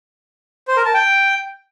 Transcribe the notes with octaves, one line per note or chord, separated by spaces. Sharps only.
C5
A#4
A5
G5